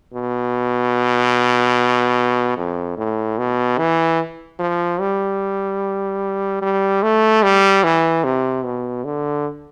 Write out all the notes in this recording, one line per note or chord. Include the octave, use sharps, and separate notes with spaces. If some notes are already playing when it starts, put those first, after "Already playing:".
B2
F2
A2
B2
E3
F3
G3
G3
A3
G3
E3
C3
B2
D3